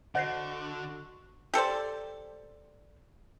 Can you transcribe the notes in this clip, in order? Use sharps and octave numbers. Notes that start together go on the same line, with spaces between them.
D3 F#4 C5 D#5 F#5 A#6 C7
G4 A4 C5 D5